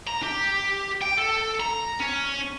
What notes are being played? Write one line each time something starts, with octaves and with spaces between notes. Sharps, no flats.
A#5
G4
G5
A4
A#5
C#4